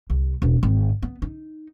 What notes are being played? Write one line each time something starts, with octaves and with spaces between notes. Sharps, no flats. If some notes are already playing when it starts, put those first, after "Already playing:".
C2
E1 C#2
G#1 D#3
B3
D#4